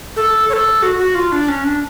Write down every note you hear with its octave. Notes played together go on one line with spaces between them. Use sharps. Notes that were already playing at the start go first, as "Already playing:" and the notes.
A4
C#5
A4
F#4
F#4
F4
D4
C#4
D4